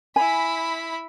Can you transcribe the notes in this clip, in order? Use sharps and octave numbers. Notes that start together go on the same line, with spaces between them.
E4 G#5 B5